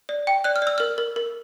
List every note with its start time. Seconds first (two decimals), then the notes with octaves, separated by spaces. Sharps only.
0.09 D5
0.27 G5
0.44 D5 F#6
0.56 F6
0.62 D5 E6
0.78 A#4 F6
0.98 A#4
1.16 A#4